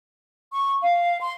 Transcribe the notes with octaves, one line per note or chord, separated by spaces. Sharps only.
C#6
F5
C6